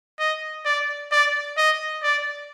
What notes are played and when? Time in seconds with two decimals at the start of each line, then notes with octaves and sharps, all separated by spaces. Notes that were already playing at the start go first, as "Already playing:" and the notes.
0.19 D#5
0.66 D5
1.12 D5
1.57 D#5
2.03 D5